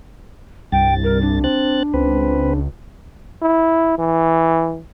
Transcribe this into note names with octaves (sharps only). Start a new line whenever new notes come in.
C2 G2 G5 A6
A#4
D4
C4 F#6 A6
C#2 C4 B4
E4
E3